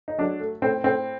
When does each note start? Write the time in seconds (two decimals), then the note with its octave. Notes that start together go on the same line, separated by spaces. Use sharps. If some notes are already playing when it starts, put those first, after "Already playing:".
0.08 D#4
0.18 F#3 D4
0.40 A3
0.62 A2 C4
0.84 A2 C4